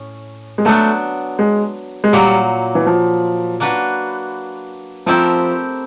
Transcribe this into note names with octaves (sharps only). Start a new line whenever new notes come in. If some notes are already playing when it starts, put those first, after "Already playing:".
Already playing: A2 C#4
G#3
F#3 A3 B3 D4
G#3
G#3
A#2 F#3 G3 A#3
E3
F3
A#3 D4 F#4 B4
F3 A3 C4 E4 G4 A#4